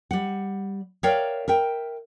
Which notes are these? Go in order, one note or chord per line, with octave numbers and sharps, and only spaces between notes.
G3 F#5
A#4 C#5 D5 E5 F5 G5
A#4 E5 G5